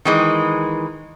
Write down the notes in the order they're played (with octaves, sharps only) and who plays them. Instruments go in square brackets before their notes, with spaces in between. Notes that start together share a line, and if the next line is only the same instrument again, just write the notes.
[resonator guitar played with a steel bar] D#3 E3 G#3